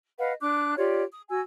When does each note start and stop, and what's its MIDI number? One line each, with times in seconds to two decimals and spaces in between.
0.18 0.33 71
0.18 0.33 75
0.18 0.33 77
0.18 0.33 78
0.41 0.75 62
0.41 0.75 86
0.41 0.75 90
0.77 1.04 65
0.77 1.04 67
0.77 1.04 73
0.77 1.04 74
1.13 1.23 87
1.29 1.39 66
1.29 1.39 80
1.29 1.39 88